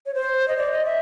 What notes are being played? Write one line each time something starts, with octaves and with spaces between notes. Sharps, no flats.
C#5
C5
D#5
D5
D#5
E5